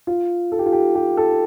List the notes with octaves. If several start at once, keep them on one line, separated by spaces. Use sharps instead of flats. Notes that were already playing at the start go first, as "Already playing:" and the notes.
F4
A4
G4
F4
G4
G4
A4